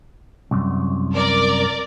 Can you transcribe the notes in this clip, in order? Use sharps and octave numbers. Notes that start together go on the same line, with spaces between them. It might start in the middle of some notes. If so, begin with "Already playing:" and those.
C2 F#2
A#4 D5